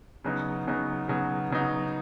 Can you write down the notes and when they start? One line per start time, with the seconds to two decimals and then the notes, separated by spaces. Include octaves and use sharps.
0.24 C#3 F#3 B3 D#4
0.67 C#3 F#3 B3 D#4
1.08 C#3 F#3 B3 D#4
1.50 C#3 F#3 B3 D#4